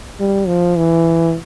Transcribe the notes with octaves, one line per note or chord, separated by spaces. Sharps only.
G3
F3
E3